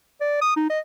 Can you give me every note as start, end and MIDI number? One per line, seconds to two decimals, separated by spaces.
0.21 0.39 74
0.41 0.56 87
0.56 0.69 63
0.70 0.79 75